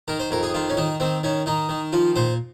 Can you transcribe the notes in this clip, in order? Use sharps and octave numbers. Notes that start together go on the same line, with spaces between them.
D#3 A#4
C5
F2 A#4
G#4
D#3 F4
C#4
D#3 D#4
D#3 C4
D#3 C#4
D#3 D#4
D#3
F3 F4
A#2 C5